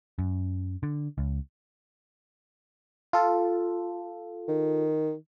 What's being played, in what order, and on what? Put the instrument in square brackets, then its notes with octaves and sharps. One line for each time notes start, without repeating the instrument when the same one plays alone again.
[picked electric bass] F#2
D3
C#2
[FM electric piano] F4 A4
[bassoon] D#3